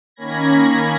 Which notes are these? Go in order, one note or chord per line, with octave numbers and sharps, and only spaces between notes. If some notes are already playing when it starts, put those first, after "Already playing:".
D#3 A#3 C#4 B5 G#6 A#6